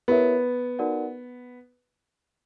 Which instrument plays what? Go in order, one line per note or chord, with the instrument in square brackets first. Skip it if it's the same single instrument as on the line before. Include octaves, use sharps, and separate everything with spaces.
[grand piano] B3 [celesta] E4 G4 A#4 C#5 E5
[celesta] D#4 F#4 A#4 D5 F#5